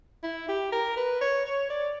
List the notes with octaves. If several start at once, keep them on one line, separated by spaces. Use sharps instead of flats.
E4
G4
A#4
B4
C#5
C#5
D5